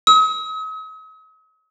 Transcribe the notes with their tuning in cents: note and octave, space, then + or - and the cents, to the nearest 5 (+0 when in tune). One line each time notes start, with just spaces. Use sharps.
D#6 +45